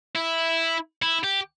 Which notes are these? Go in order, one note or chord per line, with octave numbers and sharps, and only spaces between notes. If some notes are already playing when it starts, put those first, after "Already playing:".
E4
E4
G4